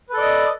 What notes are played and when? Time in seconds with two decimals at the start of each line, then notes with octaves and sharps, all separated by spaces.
0.09 B4
0.13 A4
0.17 D5
0.21 D#5